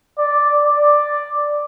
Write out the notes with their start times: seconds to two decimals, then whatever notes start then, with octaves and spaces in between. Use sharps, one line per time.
0.18 D5
0.64 D5